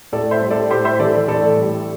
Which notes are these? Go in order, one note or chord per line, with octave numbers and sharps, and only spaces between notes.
A2 A4 D5
C5 E5
G3
A4 D5
A2 G4 C5
C5 E5
E3 A4 D5
A2 A4 D5
G3